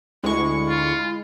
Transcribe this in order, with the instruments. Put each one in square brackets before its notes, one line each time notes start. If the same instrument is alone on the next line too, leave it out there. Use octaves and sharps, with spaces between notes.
[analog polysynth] D2 C#6 [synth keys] G#3 [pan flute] E4
[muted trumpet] F4